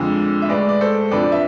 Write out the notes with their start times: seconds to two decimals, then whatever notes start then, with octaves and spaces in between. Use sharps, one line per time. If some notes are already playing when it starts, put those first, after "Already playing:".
Already playing: F2 D3 F3 G#3
0.42 E5
0.49 A2 G#3 B4 D5
0.69 D5
0.81 A4 C5
1.11 F2 D3 F3 B4 D5
1.32 E5